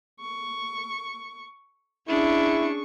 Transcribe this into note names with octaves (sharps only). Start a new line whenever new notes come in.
C#6
C#4 D4 E4 G#4 C#6